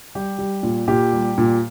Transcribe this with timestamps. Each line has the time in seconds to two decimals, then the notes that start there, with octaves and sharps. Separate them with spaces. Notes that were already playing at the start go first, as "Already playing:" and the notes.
0.15 G3 G4
0.39 G3
0.63 A#2
0.88 A#2 G4
1.13 G3
1.38 A#2